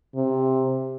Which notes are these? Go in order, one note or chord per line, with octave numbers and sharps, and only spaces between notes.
C3